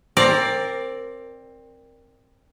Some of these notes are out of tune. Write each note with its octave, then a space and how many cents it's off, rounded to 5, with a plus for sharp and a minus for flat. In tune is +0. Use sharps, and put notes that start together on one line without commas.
C4 +15 A#4 +0 D5 +0